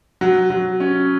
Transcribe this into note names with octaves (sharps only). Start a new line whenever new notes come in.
F#3
F#3
C#4